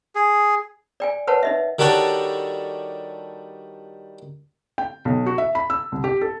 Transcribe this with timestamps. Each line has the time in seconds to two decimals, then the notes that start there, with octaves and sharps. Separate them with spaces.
0.15 G#4
1.00 D5 G5 G#5
1.27 A#4 B4 C#5 F#5 A5
1.43 D#4 D#5 E5
1.79 D#3 G3 D4 F#4 A4 C#5
4.78 G5
5.05 B1
5.27 F#4
5.38 E5
5.55 B5
5.70 E6
5.92 C2
6.04 G4
6.21 A4